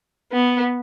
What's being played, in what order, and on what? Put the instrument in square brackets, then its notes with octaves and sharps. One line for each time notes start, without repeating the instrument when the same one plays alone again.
[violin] B3